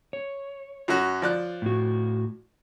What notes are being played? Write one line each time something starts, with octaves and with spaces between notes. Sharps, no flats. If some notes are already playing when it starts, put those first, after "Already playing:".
C#5
F#2 C#4 F#4
F3 D5 F#6
A2 F#4